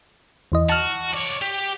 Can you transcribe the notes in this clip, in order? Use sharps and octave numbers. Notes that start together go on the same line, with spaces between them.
E2 E3 D#5
F#4 A5 F6
C#5 D5
G4